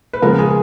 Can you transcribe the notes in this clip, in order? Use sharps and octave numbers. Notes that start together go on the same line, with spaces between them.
B4
C#3 F3 G#3 B3 A#4
G#4